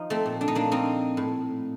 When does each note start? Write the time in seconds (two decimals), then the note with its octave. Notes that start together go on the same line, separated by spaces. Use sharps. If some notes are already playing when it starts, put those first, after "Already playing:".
Already playing: F3 D#4
0.10 A3 C4
0.26 A#2
0.41 D4
0.48 D#4
0.55 A#3 D4
0.71 F3 C4 D#4
1.17 A2